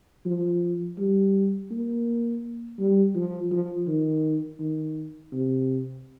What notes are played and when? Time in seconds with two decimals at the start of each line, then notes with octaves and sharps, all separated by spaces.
0.25 F3
0.98 G3
1.71 A#3
2.79 G3
3.15 F3
3.51 F3
3.87 D#3
4.60 D#3
5.32 C3